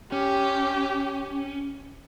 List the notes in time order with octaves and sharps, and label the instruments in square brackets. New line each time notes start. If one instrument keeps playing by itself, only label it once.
[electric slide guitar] C#4 [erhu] G4